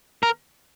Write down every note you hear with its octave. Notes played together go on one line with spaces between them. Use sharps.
A#4